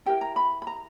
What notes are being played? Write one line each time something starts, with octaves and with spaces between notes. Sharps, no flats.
E4 G4 A#4 G5
A#5
B5
B5
A#5